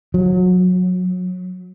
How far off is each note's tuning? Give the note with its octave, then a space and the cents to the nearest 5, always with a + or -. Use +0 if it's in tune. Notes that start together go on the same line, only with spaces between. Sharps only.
F#3 -25